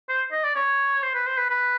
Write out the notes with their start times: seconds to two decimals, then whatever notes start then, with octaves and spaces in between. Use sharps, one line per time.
0.09 C5
0.32 D#5
0.44 D5
0.56 C#5
1.03 C5
1.14 B4
1.27 C5
1.38 B4
1.50 B4